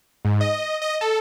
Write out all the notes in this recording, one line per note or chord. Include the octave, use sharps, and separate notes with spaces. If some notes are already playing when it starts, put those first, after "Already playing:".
G#2
D#5
D#5
A4